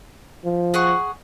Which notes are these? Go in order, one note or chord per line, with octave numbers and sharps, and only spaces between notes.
F3
G#4 F#5 C#6